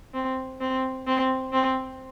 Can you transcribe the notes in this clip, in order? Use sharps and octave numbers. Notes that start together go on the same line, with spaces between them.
C4
C4
C4
C4